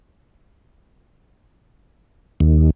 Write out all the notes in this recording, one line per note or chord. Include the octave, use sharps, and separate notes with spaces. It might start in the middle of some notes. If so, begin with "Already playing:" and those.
D#2